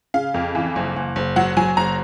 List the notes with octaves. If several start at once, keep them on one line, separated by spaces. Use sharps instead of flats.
C#3 F5
F2
E3
F#1
F#1
F#1
F#3 F#5
F#3 G#5
F#1 A#5